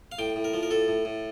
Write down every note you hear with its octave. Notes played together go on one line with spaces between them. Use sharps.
F5
A2 G5
A2
A#4
F3
A#4
A2 A4
A2
A2